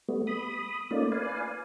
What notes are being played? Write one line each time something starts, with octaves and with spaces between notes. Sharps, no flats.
G3 A3 B3
B5 D#6
A3 A#3 C#4 D#4 F4 D5
B4 D5 F5 G#5